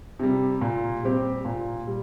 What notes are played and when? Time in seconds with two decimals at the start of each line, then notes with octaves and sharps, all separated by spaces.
0.19 C3 G3
0.61 A#2
1.03 G3 C4 G4
1.45 A#2
1.87 G3